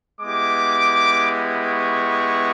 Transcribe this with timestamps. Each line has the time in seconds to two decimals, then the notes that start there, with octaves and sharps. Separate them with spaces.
0.21 G#3 B3 E4 G4 D6
1.62 C#6